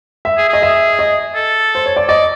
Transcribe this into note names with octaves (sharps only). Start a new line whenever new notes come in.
E5
G#4
G#4 D#5
E5
D#5
A4
C5
C#5
D5
D5 D#5